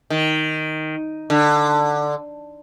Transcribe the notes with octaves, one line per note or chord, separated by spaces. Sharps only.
D#3
D3